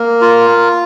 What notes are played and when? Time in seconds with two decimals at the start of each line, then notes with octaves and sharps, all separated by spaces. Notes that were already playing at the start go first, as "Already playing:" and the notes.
Already playing: A#3 A#4
0.21 F4